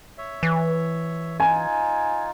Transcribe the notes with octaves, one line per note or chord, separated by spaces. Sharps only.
C#5 E5
E3
D#4 F4 G#5